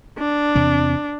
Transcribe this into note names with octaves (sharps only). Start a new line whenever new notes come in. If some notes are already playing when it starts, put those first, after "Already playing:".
D4
E2 C3 C4